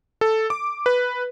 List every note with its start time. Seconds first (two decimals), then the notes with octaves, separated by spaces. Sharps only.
0.21 A4
0.50 D6
0.86 B4